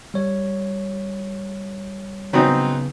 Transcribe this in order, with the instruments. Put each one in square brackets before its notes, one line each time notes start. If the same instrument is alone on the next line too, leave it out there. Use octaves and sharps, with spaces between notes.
[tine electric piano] G3 C#5
[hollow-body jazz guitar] C#3 B3 [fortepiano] F#3 C4 D#4